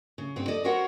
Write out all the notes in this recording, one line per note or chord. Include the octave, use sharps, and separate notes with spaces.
C#3
G2 B3 C4
A4 D5 D#5
F#4 A#4 C5 C#5 F#5